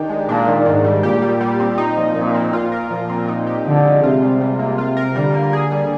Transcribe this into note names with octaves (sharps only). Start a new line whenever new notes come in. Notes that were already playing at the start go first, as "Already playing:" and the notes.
Already playing: D#3 D4 D#4 G4
G#3
A#2 D4
D#3
G#2 D#3
G3
A#2 G4
G3
G3
C4
A#2 D#4
F3
A#2 F3
C4
A#2 F4
A#4
A#2 F3
C4
D#4
G4
D3 F3
G#3
C3 F4
G3
C3 G3
A#3
F4
A#4
D3 G3
A#3
G#4
G3